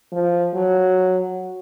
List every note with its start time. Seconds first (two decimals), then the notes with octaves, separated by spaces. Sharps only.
0.13 F3
0.55 F#3